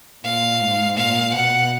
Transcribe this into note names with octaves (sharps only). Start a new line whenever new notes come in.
A#2 F5
G#2
A#2 F5
B2 F#5